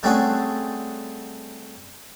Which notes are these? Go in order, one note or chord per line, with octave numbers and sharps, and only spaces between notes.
G3 A3 C4 C#4 F#4 G#4